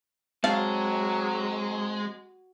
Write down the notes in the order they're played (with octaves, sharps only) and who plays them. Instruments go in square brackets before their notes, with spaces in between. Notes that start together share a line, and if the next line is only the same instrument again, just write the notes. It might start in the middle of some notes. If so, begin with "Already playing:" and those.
[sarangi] F#3 [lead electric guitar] G#3 [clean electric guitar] C4 A5 [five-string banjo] F5